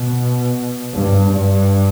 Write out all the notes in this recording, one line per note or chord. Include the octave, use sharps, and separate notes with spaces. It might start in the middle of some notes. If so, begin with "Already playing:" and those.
Already playing: B2
G2
G2